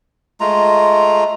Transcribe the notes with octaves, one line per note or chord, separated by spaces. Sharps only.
G#3 A3 F4 A#5